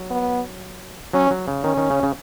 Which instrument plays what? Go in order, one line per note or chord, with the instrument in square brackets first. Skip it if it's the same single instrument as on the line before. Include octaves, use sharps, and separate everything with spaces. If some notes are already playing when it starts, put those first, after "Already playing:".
Already playing: [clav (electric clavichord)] F#3
[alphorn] B3
[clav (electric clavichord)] F#3 [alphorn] C#4
[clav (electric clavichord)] F#3
C#3
[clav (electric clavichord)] D#3 [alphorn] C#4
[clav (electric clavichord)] D#3
C#3
C#3